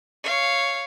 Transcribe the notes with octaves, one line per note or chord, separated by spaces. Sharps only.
C#5 F5